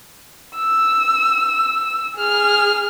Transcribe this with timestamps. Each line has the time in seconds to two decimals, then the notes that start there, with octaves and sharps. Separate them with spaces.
0.56 E6
2.18 G#4 F6